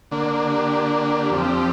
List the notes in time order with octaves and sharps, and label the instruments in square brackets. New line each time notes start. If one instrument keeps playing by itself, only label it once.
[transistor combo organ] D3 A#3 D4 [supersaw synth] C5
[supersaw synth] G4
F4
G4
[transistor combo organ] F2 F3 C4